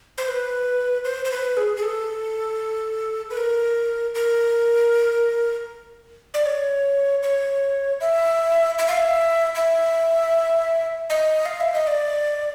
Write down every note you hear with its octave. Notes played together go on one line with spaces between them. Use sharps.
C5
B4
C5
C5
B4
G#4
G#4
A4
B4
A#4
A#4
D5
C#5
C#5
E5
E5
F5
E5
E5
D#5
F5
E5
D#5
D5